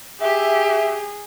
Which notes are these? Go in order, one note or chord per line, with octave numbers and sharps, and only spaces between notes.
G4 G#4 E5